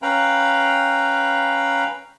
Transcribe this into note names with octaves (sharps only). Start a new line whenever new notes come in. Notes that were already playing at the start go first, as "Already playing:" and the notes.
C#4 B4 F5 G5 A#5 B5